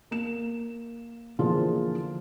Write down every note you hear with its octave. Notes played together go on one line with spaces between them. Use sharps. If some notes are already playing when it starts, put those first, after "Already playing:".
A#3 E7
D3 E3 F3 A#3 F4 G#4